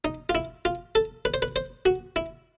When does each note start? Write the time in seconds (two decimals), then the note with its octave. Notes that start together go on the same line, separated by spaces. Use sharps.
0.05 D#4
0.29 F4
0.35 E4
0.65 F4
0.95 A4
1.25 B4
1.34 C5
1.42 B4
1.56 C5
1.86 F#4
2.16 E4